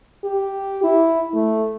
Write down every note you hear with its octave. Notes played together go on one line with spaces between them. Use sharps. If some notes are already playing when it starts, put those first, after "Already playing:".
G4
E4
A3